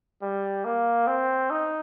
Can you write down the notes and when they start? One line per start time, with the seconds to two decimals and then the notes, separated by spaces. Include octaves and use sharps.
0.22 G3
0.65 A#3
1.07 C4
1.50 D#4